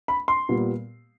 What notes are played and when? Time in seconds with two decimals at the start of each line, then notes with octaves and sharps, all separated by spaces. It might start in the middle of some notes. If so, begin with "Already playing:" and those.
0.08 B5
0.28 C6
0.49 A#2 G3 B3